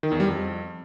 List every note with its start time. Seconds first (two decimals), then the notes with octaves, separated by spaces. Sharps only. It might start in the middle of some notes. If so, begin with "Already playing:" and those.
0.03 D#3
0.12 E2
0.20 G3
0.28 F2